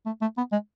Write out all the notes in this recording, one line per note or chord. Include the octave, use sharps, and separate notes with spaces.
A3
A3
B3
G#3